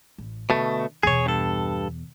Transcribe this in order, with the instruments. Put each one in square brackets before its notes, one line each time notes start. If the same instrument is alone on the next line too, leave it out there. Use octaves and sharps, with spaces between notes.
[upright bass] A1
[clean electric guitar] B2 A3 [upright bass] D3
[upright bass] E2 B2 [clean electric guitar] G#4 C#5
[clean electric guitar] G2 A4